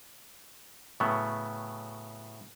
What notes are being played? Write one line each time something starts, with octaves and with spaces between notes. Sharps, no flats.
A2 C#3 F#3 A3 B3